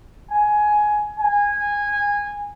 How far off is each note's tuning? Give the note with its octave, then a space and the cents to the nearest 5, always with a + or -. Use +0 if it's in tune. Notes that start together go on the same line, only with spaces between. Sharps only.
G#5 +15
G#5 -15